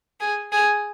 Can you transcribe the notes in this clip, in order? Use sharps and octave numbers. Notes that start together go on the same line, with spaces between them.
G#4
G#4